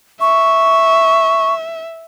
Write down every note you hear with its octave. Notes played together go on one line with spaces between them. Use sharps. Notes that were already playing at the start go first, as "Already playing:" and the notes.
E5 C#6